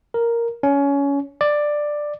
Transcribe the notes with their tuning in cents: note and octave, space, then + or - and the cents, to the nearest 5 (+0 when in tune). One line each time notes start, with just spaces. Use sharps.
A#4 +0
C#4 +20
D5 +10